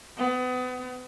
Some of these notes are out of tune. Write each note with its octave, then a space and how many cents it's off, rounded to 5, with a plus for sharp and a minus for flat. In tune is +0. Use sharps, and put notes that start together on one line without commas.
B3 +35